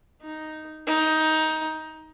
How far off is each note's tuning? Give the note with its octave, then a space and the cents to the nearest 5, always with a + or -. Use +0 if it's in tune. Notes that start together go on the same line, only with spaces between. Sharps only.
D#4 +0
D#4 +15